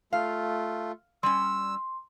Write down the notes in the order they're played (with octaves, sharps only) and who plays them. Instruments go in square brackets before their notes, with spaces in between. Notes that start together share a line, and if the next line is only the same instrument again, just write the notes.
[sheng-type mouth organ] A3 F4 [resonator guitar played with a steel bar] F5
[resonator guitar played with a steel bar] G3 C#4 [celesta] C6 [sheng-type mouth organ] E6